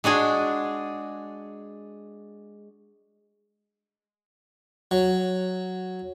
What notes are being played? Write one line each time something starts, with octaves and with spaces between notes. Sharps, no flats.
G#3 D4 F#4 G#4
F#3